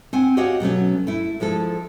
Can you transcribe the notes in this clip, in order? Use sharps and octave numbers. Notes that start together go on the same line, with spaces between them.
C4 F#5 G#5
F#4 G4 C#5 D#5 F5 F#5
B2 F#3 A3 C#4
A3 E4
F3 G#3 E4 A4